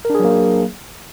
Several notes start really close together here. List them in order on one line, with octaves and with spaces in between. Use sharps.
A#4 D4 G#4 F#3 A#3